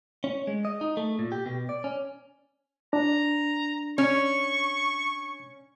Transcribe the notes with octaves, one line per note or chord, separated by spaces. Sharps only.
C#4
G#3
D#5
D#4
A3
A#2
G4
B2
D5
C#4
D4 A#5
C#4 C#6